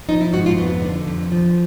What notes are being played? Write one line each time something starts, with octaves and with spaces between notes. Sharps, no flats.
F3 D#4
E4
G#2 F#4
F4
F2 B3
D3
F2
F3